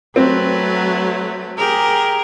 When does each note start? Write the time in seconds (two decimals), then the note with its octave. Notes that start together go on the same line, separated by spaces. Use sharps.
0.16 F#3 A3 C4 B4
1.58 G4 G#4 A#4